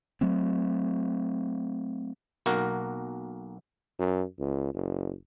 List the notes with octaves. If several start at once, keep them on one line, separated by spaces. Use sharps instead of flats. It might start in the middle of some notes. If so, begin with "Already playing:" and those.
F#3 A3 C4
B1 A#3 F#4 A#4
F#2
C#2
F#1